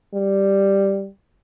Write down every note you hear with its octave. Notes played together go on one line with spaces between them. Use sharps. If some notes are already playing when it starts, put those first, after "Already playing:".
G3